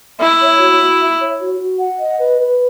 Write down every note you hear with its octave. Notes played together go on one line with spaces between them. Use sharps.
E4 E5
C#5
F#4
F#4
E5
C#5
F#4
F#4
F#5
D#5
B4
B4